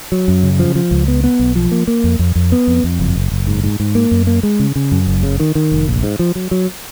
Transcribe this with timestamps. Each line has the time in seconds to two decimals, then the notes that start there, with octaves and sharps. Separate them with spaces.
0.12 F#3
0.28 F#2
0.43 C#3
0.59 F3
0.75 F3
0.91 C#2
1.08 B3
1.24 B3
1.39 B1
1.56 F3
1.71 A#3
1.88 A#3
2.04 F2
2.19 F2
2.35 F2
2.52 B3
2.67 F2
2.84 F2
3.00 F#1
3.15 F#1
3.32 F#1
3.47 G#2
3.64 G#2
3.80 G#2
3.95 A#3
4.11 F#2
4.27 A#3
4.43 G#3
4.60 C#3
4.76 C#3
4.92 F#2
5.07 F#1
5.23 C#3
5.40 D#3
5.55 D#3
5.72 F1
5.87 A#1
6.03 G#2
6.19 F3
6.35 F#3
6.51 F#3